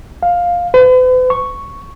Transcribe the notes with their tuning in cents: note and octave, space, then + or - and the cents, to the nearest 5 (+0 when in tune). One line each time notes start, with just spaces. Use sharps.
F5 +10
B4 +45
C#6 +0